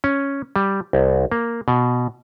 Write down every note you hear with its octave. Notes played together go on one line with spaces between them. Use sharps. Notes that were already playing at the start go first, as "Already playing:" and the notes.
C#4
G3
C2
A#3
B2